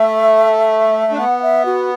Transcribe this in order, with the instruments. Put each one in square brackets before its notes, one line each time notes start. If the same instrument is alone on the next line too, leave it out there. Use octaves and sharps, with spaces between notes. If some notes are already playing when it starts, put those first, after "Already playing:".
Already playing: [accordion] A3 [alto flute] E5
[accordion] D4
[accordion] B3 [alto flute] F#5
[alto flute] E5
F#4